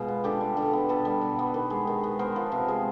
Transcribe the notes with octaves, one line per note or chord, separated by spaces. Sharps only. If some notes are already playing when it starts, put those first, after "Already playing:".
Already playing: B2 G#3 F4
B3
D3 G4 A4
G3
D3
B3
B2 A4 B4
G3
B2
B3
D#3
G#3
D#3
B3
B3 A#4 C5
F3
C3
G#3